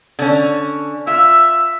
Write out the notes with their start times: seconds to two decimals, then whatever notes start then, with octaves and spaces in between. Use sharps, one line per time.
0.19 D3 C#4
1.07 F4 E5